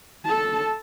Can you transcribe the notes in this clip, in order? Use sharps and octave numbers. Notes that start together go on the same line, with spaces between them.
A4 A5